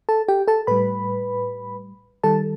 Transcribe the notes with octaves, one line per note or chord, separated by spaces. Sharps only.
A4 A5
G4 G5
A4 A5
A2 G3 B4 B5
D#3 G3 A4 A5